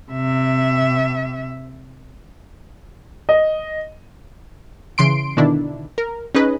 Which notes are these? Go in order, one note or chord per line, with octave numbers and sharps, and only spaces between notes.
C3 E5
D#5
C#3 E3 C6 D7
B2 D3 D#3 D4 E4
A#4
C#4 D#4 G#4 B4 D#5